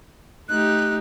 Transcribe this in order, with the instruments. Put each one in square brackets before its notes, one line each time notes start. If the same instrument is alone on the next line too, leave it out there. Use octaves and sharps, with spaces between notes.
[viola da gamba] A3 D#4 G4 [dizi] F#6